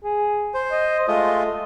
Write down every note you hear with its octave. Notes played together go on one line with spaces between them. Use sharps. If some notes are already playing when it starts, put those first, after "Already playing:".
G#4
C5
D#5
G#3 A3 F4 D#5